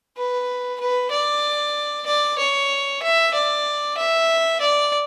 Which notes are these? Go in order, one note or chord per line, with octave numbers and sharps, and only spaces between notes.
B4
B4
D5
D5
C#5
E5
D5
E5
D5